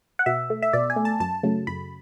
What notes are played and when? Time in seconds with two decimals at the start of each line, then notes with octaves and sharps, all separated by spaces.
0.19 F#5
0.26 B2 E5
0.50 A3
0.62 E5
0.73 B2 D5
0.90 G#5
0.96 A3
1.05 A5
1.20 F#2 A5
1.43 C#3 F#3 A3
1.67 F#2 B5